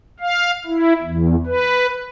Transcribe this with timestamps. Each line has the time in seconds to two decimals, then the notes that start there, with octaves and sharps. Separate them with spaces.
0.20 F5
0.67 E4
1.02 E2
1.46 B4